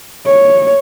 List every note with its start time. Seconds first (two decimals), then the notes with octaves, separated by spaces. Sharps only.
0.27 C#5